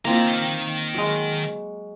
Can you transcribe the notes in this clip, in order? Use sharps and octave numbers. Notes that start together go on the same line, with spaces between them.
D#3 A#3 C4 F4 A#5
F#3 G#3